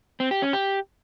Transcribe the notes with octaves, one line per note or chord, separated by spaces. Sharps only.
C4
G4
C#4
G4